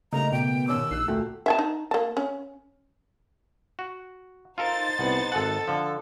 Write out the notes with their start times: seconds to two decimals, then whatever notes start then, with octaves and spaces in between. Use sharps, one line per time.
0.13 C#3 G3 A3 A#3 D#4 A#5
0.32 B2 G5
0.68 D#2 C#4 D6 E6
0.91 A#1 D#4 F#6 C7
1.08 D2 A#2 A3 F#4 G5
1.46 E5 G#5 A5
1.59 D#4
1.91 A#3 A5
2.17 C#4
3.79 F#4
4.58 D#4 F4 A4 A#4 C5 A6
4.99 C2 B3 F#5
5.32 G#1 A4 F#5
5.68 D3 F3